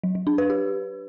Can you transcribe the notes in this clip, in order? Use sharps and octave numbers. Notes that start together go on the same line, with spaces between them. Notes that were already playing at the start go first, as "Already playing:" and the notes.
F#3
F#3
D4
B4
G4